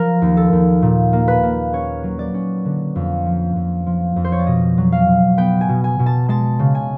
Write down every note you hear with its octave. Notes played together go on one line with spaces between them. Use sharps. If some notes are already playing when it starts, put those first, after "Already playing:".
Already playing: F3 A#4
D#2
A4
D#2
A#2
A#3
B4
A#3
C#4 C#5
F#3
D5
C#4
D3
F2
F3
F2
F3
F2
C5
C#5
D5
B2 D#5
F#3
F5
B2
B3 G5
G#5
B2
G#5
B2
A5
G#3 A5
C#3
G#5